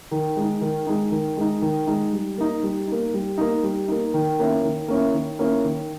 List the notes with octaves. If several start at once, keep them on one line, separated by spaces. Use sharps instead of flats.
D#3
G#3 D#4
D#3
G#3 D#4
D#3
G#3 D#4
D#3
G#3 D#4
G3
A#3 D#4
G3
A#3 D#4
G3
A#3 D#4
G3
A#3 D#4
D#3
A#3 C#4 E4
D#3
A#3 C#4 E4
D#3
A#3 C#4 E4
D#3